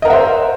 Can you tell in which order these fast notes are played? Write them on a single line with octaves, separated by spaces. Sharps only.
D#5 A#4 F#5 E5 C5